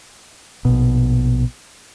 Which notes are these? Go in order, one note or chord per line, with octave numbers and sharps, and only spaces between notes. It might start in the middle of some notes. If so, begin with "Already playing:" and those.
A#1 B2